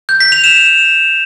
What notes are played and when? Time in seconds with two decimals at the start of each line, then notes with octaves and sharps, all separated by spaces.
0.09 G6
0.20 B6
0.32 F7
0.44 E7